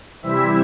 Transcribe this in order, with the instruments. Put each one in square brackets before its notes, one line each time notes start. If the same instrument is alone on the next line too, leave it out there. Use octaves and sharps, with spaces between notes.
[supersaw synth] C3 E3 G3 C4 E4 E5